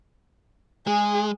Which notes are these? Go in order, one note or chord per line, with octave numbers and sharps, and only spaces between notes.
G#3 G#4